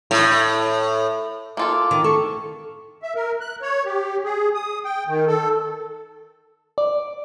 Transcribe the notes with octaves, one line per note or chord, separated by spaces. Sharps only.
A2
A#3 F4 A4 D6
D#3
A4 C#6
E5
A#4
F#6
C#5
G4
G#4
D#6
G5
D#3
A4
D5